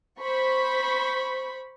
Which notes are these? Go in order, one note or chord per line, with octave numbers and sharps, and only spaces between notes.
C5 B5 C#6